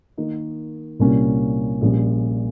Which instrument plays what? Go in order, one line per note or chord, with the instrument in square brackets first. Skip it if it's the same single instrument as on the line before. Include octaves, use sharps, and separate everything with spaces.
[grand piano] D#3 A#3 D#4
C2 A#2 G3 A#3 C#4
A#1 A#2 G3 C#4